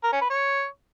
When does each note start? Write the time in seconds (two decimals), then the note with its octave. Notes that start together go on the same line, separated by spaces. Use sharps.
0.04 A#4
0.13 C#4
0.21 B4
0.30 C#5